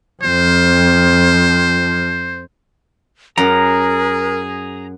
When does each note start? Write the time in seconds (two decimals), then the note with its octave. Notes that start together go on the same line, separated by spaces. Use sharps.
0.23 F2 F3 C5
3.38 F#2 G#4 A#4 A#5